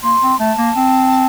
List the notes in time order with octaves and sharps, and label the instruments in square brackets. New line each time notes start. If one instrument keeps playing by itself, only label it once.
[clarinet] A#3 [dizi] C6
[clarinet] C4
[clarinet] A3 [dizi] A5
[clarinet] A#3
C4